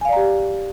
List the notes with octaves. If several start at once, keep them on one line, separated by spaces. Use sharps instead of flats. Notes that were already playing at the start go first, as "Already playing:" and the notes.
G4 D5 F5 G#5 A#5